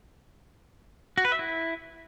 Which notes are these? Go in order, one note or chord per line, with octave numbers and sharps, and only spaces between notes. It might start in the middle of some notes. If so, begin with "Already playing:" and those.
F#4
B4
E5
E4